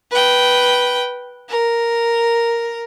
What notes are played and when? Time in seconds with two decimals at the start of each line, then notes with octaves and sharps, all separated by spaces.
0.11 B4 G5
1.49 A#4